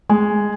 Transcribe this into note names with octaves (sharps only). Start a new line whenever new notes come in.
G#3